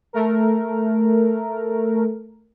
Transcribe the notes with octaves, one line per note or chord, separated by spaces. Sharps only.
A3 A#4